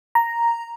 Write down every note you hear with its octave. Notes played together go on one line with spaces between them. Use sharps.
A#5